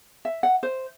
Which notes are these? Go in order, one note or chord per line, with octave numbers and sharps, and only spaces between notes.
E5
F#5
C5